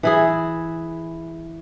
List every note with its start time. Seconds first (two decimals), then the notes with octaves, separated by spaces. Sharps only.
0.03 E3 E4 G#4